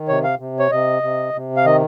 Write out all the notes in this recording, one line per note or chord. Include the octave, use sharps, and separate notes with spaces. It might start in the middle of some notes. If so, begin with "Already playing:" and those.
Already playing: D#3
C3 C#5
F5
C3
C#5
C3 D#5
C3
C3
F5
D#3 D#5